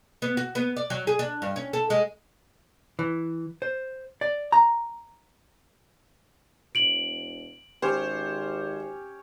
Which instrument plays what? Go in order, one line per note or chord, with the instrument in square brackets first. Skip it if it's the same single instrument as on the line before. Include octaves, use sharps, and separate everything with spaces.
[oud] B3
F#4
B3
D5
F#3
G#4
D4
G2
C#4
A4
G#3
[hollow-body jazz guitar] E3
C5
D5
A#5
[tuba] E1 [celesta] D7 F#7
[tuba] G#1 [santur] C#4 G4 C#5 [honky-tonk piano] C5